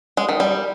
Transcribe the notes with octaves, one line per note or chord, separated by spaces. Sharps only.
G#3
D#3
G3